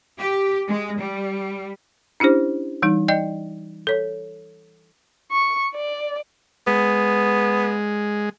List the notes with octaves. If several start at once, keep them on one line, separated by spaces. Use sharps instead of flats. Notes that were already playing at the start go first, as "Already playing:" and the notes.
G4
G#3
G3
C#4 D4 E4 G4 C5
E3 G3 D#4
D5 D#5 G5 G6
A4 C#5
C#6
D5
G#3 B3